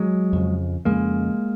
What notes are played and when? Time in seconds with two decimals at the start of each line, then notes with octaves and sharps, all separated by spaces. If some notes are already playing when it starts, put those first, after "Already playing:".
Already playing: F#3 G#3
0.33 F2 C#3
0.85 F2 C#3 G#3 A#3